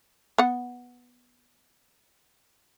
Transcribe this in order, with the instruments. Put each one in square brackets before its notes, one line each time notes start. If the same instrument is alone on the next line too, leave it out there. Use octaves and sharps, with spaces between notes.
[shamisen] B3 F#5